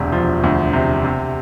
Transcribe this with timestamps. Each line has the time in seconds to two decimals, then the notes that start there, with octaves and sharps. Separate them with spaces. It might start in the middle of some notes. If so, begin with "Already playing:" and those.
Already playing: E1 D2 C3
0.12 F3
0.43 D2
0.73 C3
1.05 C3